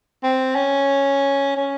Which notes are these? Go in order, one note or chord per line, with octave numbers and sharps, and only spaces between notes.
C4
C#4
C#4